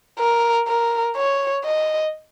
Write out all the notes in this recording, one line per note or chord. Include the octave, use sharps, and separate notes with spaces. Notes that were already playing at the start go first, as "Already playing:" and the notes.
A#4
A#4
C#5
D#5